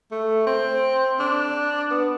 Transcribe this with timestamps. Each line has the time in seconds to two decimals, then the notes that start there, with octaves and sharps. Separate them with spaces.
0.11 A3
0.47 C4
1.19 D4
1.90 B3